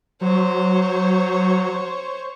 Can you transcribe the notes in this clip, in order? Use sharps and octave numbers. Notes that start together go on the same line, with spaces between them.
F#3 C5 C#5